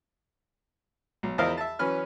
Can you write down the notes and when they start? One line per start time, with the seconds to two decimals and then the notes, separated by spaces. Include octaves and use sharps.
1.23 B1
1.38 E2 F3 E4 A#4 D#5 F5
1.57 E5 A5
1.79 E3 F#3 C#4 B4 F6